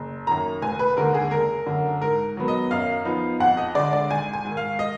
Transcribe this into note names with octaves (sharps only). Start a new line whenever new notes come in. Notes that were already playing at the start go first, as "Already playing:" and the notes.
Already playing: F#1
F#2 D#3 A#3 A#5
F1 G#5
B4
D#2 D3 G#3 A#4
G#4
F#1 A#4
F#2 D3
G#2 A#4
D#3 F#3 B3
D#5
F#2 F5
F3 B3 D#4
F2 F#5
D#5
D3 G#3 D4 D5
D5
G#1 G#5
G#5
G#2 D#3
F5
D#5